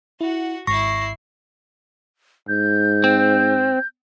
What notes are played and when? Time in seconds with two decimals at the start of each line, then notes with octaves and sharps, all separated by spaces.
0.21 E4 F#4 F#5
0.67 G#1 E4 C#6 A#6 C7
2.48 G#2 G6
3.04 C4